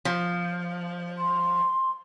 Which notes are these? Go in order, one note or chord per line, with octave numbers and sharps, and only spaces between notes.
F3
C6